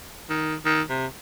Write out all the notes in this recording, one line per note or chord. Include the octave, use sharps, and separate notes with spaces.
D#3
D#3
C3